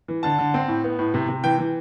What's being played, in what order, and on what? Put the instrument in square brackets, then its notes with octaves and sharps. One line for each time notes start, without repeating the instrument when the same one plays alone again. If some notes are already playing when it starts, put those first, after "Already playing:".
[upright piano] E3
D3 A5
D3
C4
A2
B3
A2
C3
C3
E3 G5
E3